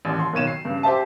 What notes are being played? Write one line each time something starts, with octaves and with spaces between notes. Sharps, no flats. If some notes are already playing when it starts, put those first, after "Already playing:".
A1 D#2
C6
B1 D#3 C#5 D#7 E7
C7
G2 C#3
G4 C5 E5 A5